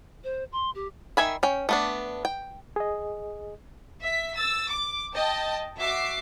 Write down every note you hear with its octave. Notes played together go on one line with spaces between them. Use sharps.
C5
C6
G4
D#3 E5 G#5 B5
C#4 G5
A3 B3 D4
G5
G#4 D#5
E5 B6
E6 A6
D6
D#5 G5 A5
F#4 E5 D6 C7